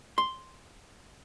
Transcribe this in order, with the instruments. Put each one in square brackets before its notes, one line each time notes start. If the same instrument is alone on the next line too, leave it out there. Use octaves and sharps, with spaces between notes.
[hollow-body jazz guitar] C6